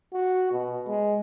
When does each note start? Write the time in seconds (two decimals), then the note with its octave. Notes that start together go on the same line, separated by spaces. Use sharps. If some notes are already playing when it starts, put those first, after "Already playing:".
0.13 F#4
0.52 B2
0.87 G#3